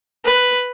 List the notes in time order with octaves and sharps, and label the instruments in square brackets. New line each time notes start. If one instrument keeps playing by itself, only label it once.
[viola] B4